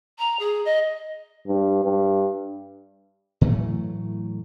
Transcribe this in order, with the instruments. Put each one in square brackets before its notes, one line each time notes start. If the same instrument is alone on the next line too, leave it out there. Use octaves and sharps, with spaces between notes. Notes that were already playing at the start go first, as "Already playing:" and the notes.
[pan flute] A#5
G#4
D#5
[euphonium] G2
G2
[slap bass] A2 E3 F#3 A3